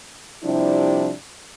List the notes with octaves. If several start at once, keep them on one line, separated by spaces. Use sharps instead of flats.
C3 F3 G3 D4 E4